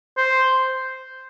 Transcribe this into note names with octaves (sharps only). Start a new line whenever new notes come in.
C5